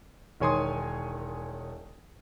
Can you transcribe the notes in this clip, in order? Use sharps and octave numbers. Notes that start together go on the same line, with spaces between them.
E1 D#3 C#5 G#5 C6 D#6